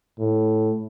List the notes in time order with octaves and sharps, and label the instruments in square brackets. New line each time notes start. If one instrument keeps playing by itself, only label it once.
[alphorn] A2